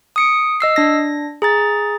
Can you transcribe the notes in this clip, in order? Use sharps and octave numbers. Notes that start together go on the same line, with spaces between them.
D#6 C#7 D7
D#5 E6 C7
D4 A#6
G#4 A#5 A6